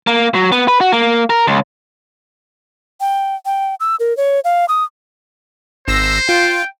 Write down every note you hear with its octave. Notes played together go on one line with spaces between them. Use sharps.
A#3
F#3
B3
B4
F#4
A#3
A#4
C#2
G5
G5
E6
A#4
C#5
F5
D#6
G#1 C5 E6 A#6
F4 G5